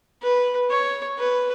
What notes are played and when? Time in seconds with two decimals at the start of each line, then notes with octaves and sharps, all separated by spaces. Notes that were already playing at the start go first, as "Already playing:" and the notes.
0.22 B4
0.70 C#5
1.18 B4